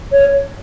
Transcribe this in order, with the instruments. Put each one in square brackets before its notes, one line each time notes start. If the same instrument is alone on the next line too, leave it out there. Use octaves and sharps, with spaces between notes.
[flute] C#5